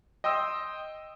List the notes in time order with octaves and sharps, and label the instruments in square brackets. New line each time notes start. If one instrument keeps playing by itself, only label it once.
[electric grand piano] D#5 G5 C6 D#6 E6